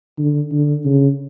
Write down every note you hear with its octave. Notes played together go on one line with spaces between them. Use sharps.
D3
D3
C#3